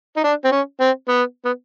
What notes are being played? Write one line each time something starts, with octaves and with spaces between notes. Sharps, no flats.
D#4
D4
C4
C#4
C4
B3
B3